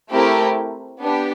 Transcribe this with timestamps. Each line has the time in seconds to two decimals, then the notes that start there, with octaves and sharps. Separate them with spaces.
0.12 A3 C4 E4 G4 A#4
1.01 B3 D4 G4